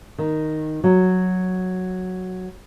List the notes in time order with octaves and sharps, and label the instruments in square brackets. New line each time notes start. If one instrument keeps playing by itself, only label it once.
[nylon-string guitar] D#3
F#3